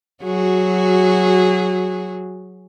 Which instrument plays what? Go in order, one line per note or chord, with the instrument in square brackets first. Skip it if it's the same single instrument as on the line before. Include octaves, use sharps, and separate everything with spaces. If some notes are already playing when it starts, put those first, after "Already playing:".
[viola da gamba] F#3 F#4 G#4